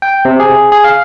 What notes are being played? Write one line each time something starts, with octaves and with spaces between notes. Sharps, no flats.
G5
C3
G#4
G#4
F5